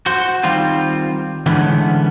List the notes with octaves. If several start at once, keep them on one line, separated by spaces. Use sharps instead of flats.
F#4 C5
D#3 G3 C4 F4
D3 E3 G#3 A3 B3 C#4